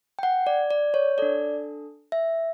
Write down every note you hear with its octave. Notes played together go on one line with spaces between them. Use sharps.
G5
F#5
D5
D5
C#5
D4 A4 D5
E5